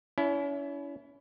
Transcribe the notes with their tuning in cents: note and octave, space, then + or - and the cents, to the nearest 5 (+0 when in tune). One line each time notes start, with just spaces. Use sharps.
C#4 +35 E4 +0